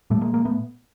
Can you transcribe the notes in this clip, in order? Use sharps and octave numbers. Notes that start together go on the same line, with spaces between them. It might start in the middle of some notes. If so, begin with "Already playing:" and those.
A#2 G3 A3
G#3 A#3
G#3 A#3
A3 B3